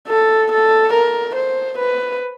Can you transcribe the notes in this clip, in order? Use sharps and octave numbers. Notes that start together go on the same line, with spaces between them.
A4
A4
A#4
C5
B4